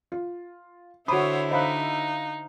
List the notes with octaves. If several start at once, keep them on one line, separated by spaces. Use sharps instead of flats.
F4
D3 E4 F#4 C5 C#5 B5 D6 D#6
D#4 C5 D#5 F5 B5 F#6